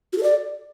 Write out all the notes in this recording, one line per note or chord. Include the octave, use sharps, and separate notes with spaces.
F#4
A4
D5